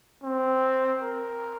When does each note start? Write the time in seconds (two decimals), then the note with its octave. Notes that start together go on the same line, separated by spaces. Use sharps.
0.23 C4
1.02 A#4